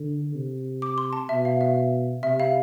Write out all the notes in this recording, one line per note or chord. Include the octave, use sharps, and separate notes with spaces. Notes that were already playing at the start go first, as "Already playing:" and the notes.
Already playing: D3
C3
D6
C6
A5
B2 E5
F5
E5
C3 E5
F5